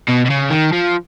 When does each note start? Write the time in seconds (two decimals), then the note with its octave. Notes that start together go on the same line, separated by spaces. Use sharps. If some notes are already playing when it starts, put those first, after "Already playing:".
0.08 B2
0.25 B2
0.30 C#3
0.50 D#3
0.73 F3